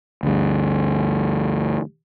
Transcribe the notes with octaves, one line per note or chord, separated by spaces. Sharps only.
D2 G2